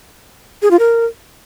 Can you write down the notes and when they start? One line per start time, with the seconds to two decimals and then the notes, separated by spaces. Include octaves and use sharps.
0.62 G#4
0.71 F4
0.79 A#4